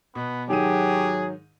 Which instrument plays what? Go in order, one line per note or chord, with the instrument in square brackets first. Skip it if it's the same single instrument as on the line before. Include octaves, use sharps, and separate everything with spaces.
[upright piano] B2 [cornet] B3
[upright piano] G#2 D#3 D#7 [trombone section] F#3 [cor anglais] G4 [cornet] G#4